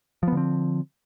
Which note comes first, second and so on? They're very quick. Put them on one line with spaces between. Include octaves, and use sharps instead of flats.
F3 B3 D3 C4